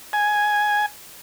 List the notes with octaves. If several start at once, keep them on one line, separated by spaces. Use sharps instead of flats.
G#5